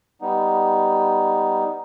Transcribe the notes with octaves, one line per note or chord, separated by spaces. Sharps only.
G3 B3 D#4